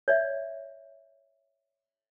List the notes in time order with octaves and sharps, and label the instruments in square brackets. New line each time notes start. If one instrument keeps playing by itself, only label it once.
[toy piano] C#5 D5 E5